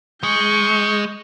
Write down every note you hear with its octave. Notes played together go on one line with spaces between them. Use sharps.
G#3 C#6 G6